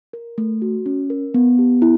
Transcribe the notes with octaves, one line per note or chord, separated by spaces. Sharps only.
A#4
A3
F#4
C#4
A#4
B3
G4
E4